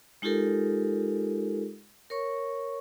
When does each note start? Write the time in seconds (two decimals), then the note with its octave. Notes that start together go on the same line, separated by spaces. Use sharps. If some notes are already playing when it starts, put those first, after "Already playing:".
0.22 G#3 D#4 F4 G4 A4 A#4
2.10 A#4 C#5 C#6